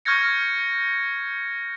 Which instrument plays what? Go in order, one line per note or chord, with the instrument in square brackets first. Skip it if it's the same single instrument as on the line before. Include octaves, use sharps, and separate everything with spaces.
[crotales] C#6 F6 G6 G#6 A#6 C#7